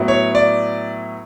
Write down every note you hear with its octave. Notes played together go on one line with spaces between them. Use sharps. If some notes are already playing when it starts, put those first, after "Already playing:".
Already playing: A2 F#3 B3 E4
C#5
D5